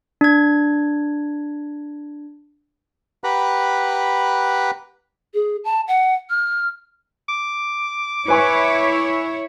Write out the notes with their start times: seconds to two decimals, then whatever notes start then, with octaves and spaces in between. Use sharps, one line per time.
0.21 D4 G#6
3.24 G4 B4 F#5 A#5 B5 F#6
5.34 G#4
5.64 A5
5.88 F#5
6.30 F6
7.29 D6
8.28 E4 B4 C#5 G#5 C#6